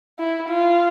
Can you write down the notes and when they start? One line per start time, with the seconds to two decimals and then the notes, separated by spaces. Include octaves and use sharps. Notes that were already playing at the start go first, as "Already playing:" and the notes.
0.19 E4
0.49 F4